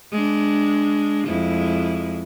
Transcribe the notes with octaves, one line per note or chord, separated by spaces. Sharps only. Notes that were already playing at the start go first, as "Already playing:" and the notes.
G#3 D4
F2 G#3 E4